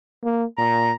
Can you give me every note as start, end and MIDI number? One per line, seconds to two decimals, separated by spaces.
0.23 0.45 58
0.58 0.91 46
0.58 0.92 82